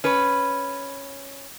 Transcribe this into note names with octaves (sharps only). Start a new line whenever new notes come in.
C#4 B4